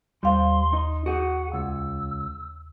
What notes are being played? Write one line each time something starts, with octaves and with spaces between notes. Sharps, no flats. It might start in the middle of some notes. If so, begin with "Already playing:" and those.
D#2 G3 C5 F5 C6
D#4
F#4 G#4 F#5
C#2 E6